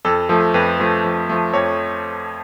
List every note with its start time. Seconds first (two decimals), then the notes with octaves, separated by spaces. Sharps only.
0.05 F2 A4
0.29 F3 A3 A4
0.54 F2 B4
0.79 F3 A3
1.04 F2
1.29 F3 A3
1.53 F2 C#5